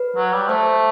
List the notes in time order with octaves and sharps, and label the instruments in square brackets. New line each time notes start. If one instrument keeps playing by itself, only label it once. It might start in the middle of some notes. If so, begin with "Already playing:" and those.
Already playing: [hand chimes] B4
[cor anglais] F#3
G3
[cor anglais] A3 [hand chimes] C5